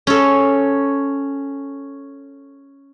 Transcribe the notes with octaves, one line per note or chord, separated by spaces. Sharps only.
C#4 A4